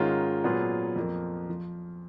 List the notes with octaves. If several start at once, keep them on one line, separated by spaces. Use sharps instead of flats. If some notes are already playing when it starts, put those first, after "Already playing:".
Already playing: G#2 D#3 G#3 C#4 F4
A#2 F#3 B3 F4 G#4
F2 F3 A#3
F3